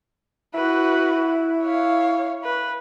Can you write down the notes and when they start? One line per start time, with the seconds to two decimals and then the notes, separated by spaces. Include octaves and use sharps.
0.54 E4 F#4 B4
1.64 C#5 F5
2.44 B4